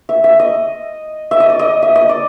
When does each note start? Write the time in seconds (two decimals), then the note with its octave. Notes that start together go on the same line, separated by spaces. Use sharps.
0.09 E5
0.24 E5
0.39 D#5
1.31 E5
1.40 D#5
1.50 D5
1.59 D#5
1.82 E5
1.95 D#5
2.09 D5